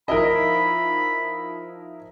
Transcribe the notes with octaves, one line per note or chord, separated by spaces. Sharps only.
F3 D#4 E4 A#4 D#5 B5